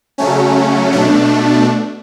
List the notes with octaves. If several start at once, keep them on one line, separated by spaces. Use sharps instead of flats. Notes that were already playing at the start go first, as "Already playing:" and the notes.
C#3 F#3 A3 C#4
B2 A3 D4